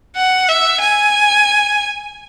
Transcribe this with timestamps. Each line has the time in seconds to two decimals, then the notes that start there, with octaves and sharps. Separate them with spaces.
0.16 F#5
0.49 E5
0.81 G#5